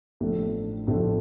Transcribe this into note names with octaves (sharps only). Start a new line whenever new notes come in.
A1 A2 F3 A3 D4
A1 A2 F3 A3 D4